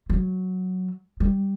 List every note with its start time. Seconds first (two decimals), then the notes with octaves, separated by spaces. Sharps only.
0.10 F#3
1.20 G3